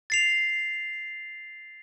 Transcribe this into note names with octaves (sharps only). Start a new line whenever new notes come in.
A6 C7 F7